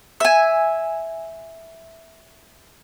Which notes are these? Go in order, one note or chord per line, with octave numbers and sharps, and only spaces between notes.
E5 G#5